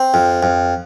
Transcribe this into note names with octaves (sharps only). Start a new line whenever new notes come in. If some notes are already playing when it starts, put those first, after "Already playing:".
Already playing: C4
F2
F2